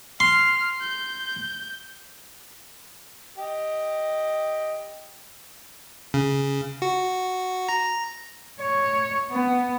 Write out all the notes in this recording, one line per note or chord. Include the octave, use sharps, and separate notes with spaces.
C6 F6
G6
G4 D#5
C#3
F#4
A#5
C#5
B3